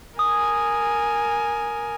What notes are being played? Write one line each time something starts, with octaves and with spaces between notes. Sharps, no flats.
A#4 G#5 D#6